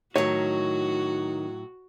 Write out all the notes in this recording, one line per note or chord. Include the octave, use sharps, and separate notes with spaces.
A2 D#3 F#3 F#4 C#5